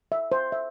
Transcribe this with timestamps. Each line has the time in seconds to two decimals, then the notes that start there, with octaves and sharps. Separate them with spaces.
0.12 E5
0.32 C5
0.52 E5